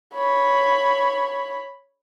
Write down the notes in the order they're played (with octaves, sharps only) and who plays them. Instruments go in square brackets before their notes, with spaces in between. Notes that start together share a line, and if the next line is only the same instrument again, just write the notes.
[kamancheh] C#5 B5